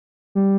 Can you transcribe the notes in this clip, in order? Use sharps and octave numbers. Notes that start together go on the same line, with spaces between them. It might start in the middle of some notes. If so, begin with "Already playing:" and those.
G3